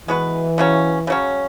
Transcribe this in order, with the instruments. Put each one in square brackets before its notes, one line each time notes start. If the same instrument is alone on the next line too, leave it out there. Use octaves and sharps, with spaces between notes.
[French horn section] E3 [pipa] G#3 B3 F#4 B4
[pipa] C#3 F#3 C#4
C#3 F#3 C#4